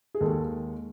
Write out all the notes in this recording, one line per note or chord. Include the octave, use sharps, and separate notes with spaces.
G#4
D#2 D#3 G#3 A4